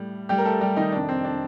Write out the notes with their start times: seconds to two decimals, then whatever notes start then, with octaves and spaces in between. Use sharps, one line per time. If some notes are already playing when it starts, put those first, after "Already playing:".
Already playing: A2 G3
0.29 A2 G3 G4
0.38 A#4
0.45 A3 A4
0.61 G3 G4
0.76 D#3 D#4
0.92 F2 C3 D#3 D4
1.09 C4
1.25 D4